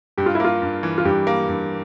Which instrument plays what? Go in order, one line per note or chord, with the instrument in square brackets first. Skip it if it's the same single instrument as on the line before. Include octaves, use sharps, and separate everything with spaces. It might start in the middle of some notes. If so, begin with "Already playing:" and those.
[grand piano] G2 [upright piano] G4
[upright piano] F4
E4
[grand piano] A#3 [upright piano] F4
[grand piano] G2
E3
[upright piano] F4
[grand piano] G2 [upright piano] G4
[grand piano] A#3
G2